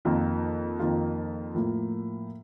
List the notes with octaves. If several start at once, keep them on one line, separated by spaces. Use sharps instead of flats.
F2 D#3 A#3 F4
F2 D#3 A#3 F4
A2 F3 A#3